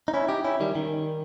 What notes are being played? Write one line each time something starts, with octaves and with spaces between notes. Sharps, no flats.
D#4
C#4 E4
D#4 G4
C#4 E4
D#3 G3
D#3